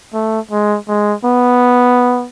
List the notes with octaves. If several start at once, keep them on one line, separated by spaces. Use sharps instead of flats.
A3
G#3
G#3
B3